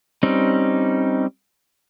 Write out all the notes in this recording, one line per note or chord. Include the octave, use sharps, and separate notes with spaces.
G3 C4 C#4 D#4